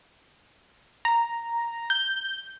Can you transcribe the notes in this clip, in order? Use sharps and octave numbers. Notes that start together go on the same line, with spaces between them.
A#5
G6